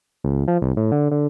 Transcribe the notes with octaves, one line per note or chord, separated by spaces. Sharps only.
C#2
F3
C2
A2
D3
D3